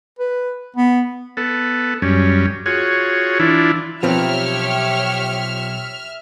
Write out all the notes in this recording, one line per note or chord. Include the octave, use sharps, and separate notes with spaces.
B4
B3
B3 A4
F#2 G3 C#4
F4 F#4 G#4 C#5
E3 D4 E4 F4
B1 F3 C4 G4 B4 C#5 E5 F6